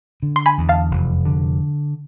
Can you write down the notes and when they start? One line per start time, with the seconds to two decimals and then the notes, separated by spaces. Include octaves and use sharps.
0.23 D3
0.36 C6
0.46 G#5 B5
0.58 E2
0.69 F5 A5
0.91 F1
1.25 D3